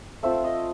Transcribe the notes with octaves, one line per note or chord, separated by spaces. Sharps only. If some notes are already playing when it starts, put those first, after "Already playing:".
A3 C4 F4 E5
D#5